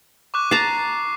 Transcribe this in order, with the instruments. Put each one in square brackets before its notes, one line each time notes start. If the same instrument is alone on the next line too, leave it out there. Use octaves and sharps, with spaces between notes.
[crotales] C#6 D6 F#6
[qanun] A5 A#5 [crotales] C7